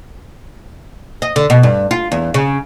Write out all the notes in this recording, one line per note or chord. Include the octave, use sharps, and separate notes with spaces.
D#5
D3
B2
G2
F4
E2
C#3